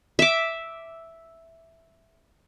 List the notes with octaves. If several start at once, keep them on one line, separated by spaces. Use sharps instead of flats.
E5 D6